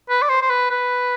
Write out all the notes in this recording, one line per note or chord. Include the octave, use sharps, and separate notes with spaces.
B4
D5
C5
C5
B4
B4